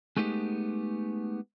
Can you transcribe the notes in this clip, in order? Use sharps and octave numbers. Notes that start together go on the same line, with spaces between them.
G#3 A3 B3 D#4 G4